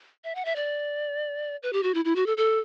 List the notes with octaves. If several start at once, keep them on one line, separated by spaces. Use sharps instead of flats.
E5
F#5
E5
D5
B4
G4
F#4
E4
E4
F#4
A4
A4